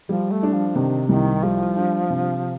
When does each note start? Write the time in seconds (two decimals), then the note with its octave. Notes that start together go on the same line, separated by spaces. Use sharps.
0.09 F3 G3
0.31 A3
0.43 D4
0.53 F3
0.76 C3 D#3
1.09 C2 D#3
1.43 F3 G3
1.77 D4
2.10 C3